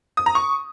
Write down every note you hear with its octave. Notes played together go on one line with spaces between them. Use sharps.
D#6
A#5
C#6